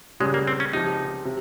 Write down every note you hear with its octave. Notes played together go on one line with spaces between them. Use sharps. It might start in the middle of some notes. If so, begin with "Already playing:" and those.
C#2 C#3 G3 G#3
A#3
C4
C#4
C#2 C3 F3 D#4
C3